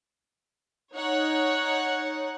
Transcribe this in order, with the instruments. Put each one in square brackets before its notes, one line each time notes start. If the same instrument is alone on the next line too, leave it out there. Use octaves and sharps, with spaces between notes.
[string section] D#4 C#5 F#5